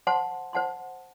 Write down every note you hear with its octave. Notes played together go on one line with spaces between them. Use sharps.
C5 F#5 A5 C6
C5 F#5 A5 C6